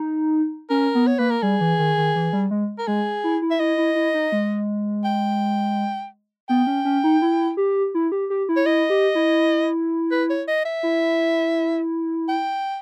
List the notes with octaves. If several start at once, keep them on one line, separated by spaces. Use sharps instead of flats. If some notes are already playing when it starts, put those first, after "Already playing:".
Already playing: D#4
C#4 A#4
B3
C#5
A#3 B4
A#4
G3 G#4
E3
D#3
D#3
E3
G3
G#3
A#4
G#3 G#4
E4
E4
E5
E4 D#5
E4
E4
D#4
G#3
G5
B3 G5
C#4
C#4
D#4
E4
G4
E4
G4
G4
E4
C#5
E4 D#5
G4
E4
B4
C#5
D#5
E5
E4
G5